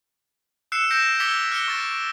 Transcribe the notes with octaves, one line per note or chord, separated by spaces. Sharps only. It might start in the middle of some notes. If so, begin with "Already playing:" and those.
E6 F#6 C7 C#7 E7
G6 A#6 D7 E7
D6 E6 G#6 B6 C#7 G7
F6 F#6 A#6 C#7 G7
C#6 A6 D7